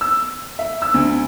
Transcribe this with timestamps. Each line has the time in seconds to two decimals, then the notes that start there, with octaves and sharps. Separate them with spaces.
0.01 E6
0.59 E5
0.82 E6
0.94 D2